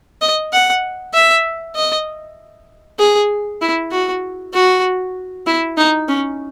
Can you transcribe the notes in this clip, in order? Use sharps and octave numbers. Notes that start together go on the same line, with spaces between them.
D#5
F#5
E5
D#5
G#4
E4
F#4
F#4
E4
D#4
C#4